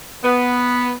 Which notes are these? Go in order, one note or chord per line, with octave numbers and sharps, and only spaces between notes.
B3